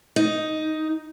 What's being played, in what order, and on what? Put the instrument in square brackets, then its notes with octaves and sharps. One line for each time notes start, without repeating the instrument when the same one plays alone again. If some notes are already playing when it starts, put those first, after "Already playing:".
[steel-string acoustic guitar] D#4